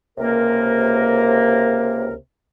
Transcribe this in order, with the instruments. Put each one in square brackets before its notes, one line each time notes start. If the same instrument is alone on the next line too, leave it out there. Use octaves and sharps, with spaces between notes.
[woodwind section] C#2 C3 A#3 A#4